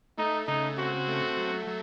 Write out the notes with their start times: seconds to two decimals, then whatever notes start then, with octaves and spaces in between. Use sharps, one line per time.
0.18 A3 D#4
0.47 C#3 D#4
0.78 C4 F#4
1.07 A3
1.37 F#3
1.67 F#3